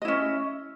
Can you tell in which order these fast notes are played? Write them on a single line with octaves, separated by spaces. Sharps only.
D#5 E4 C#4